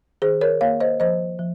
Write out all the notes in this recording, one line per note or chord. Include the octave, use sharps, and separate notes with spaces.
D#3 G#4 C5
A#4 C#5
A#3 C#5 F5
C5 D#5
F3 C5 D#5
F3